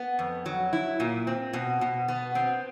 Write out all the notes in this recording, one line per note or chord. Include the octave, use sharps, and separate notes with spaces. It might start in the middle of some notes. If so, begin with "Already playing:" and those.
Already playing: B3
F2
F#3
E4
A#2
C4
B2
B2
B3
C4